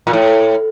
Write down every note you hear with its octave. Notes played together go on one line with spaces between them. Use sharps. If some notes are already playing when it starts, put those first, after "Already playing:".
A#2
A2